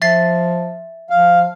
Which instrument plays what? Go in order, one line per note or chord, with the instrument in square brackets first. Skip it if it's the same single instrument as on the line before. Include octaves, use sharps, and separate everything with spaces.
[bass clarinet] F3 [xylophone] E5 A6 C7
[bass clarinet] F3 [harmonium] F5